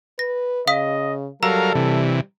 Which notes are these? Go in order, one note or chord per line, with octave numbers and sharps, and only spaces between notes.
B4 A#6
C#3 D#5 F5 D#6 B6
F#3 G3 A4 A#4 F5 A#5 E6
C3 E3